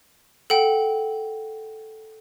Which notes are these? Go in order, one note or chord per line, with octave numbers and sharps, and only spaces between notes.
A4 F#5 G5